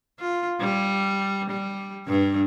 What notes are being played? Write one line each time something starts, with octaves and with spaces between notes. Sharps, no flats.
F4
G3
G3
G2